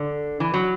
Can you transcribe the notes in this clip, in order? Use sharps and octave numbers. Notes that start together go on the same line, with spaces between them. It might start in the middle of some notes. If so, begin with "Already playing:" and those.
Already playing: D3
E3
F#3